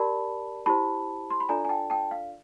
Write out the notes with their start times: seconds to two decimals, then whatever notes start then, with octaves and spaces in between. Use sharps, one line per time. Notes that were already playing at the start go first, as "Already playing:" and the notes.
Already playing: G4 A#4 D5 A5 B5
0.66 E4 G4 C5 A5 B5
1.30 C6
1.40 B5
1.49 D4 F4 A4 D5 G#5 A#5
1.65 G#5
1.69 G5 A5
1.90 G5 A5
2.11 F5